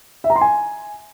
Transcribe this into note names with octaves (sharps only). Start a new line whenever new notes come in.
E5
A#5
C6
G#5